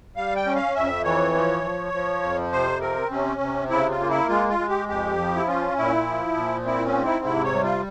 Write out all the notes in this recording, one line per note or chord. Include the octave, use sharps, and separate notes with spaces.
G3 F5
G5
C#4
F5
F2 E5
E3 C#5
F3
F3
F3
F2
C3 C5
C4 A#4
C3 C#4
C3
C#3 E4
F4
A#3
E4
G#3 F4
F4
G#3
G4
F2 G4
F3
E4
C#4 F4
A#2 E4
F3
A#2
C4 E4
C#4
G#2
E4
C3 E4
C#5
G3
F4